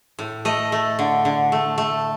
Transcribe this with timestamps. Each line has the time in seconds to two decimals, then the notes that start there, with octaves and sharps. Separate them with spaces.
0.19 A2
0.45 A3 D#5
0.72 A3
0.99 D3
1.25 D3
1.52 A3
1.78 A3